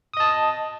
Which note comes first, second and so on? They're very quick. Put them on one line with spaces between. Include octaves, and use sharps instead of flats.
D#6 D#5 A5